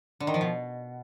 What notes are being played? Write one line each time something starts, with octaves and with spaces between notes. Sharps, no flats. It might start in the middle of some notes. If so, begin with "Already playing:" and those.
D3
D#3
F3
B2